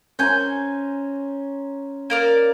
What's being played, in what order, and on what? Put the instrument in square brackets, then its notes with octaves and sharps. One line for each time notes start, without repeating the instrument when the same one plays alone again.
[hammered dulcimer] C#4 C5 A#5 [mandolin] G#5 G6
[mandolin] A#3 A#4 D5